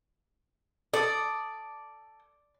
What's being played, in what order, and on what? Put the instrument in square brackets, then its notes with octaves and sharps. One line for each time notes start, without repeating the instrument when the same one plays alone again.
[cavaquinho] A4 D#6 [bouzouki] D5